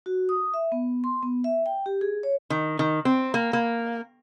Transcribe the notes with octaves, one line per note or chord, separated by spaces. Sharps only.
F#4
D#6
E5
B3
C6
B3
E5
G5
G4
G#4
C#5
D#3
D#3
C4
A#3
A#3